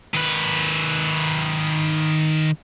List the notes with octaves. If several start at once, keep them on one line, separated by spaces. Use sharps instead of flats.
D#3 B4